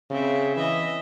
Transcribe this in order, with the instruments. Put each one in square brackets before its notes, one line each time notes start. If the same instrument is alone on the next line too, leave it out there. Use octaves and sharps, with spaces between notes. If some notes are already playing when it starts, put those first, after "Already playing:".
[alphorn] C#3 [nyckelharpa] C4 E5
[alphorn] E3 [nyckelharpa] D#5 E5